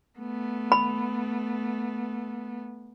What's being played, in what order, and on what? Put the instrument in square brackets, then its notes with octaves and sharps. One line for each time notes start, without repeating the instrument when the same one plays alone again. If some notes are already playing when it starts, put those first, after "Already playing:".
[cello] A3 B3
[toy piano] B5